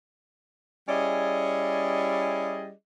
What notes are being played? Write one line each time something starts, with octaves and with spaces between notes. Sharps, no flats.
G3 C#4 E4 G#4 D5 D#5